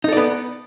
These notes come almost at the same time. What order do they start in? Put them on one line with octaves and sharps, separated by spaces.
D#4 A4 D5 B3